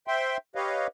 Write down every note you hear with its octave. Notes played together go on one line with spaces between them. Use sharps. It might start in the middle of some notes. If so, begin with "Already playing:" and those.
C5 E5 G5 C6
G4 B4 C#5 D#5 F5